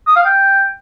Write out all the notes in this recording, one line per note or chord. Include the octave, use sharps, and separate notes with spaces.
D#6
F5
G5